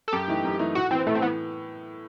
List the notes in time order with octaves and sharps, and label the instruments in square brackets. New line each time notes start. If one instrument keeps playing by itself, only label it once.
[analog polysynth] A4
[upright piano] F#2 [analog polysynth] G4
[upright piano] E3 A3 D#4
F#2
E3 A3 D#4
[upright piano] A2 [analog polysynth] F#4
[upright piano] E3 B3 [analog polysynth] C4
[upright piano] A2 [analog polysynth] A3
[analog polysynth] C4
[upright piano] E3 [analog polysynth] B3